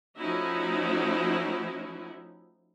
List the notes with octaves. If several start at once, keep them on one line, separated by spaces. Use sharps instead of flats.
F3 A3 C#4 D#4 E4 F#4